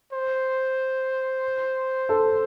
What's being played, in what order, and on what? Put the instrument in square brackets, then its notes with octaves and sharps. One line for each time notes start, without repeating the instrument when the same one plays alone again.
[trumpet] C5
[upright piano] A4